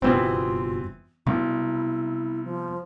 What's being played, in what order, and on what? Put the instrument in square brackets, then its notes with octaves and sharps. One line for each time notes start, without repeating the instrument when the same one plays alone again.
[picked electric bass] F#1 G2 B2 [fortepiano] E3 B3 C4 [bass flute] F4
[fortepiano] B1 [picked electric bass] C3 G3 B3 [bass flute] E4
[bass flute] F3